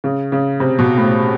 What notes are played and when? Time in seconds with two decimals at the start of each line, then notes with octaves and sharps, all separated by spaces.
0.04 C#3
0.32 C#3
0.60 C3
0.79 B2
0.98 A2